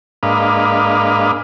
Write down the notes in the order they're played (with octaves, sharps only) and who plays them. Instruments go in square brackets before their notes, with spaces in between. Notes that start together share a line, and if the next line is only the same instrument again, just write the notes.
[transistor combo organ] G#2 A#3 D4 B4 D#5 F5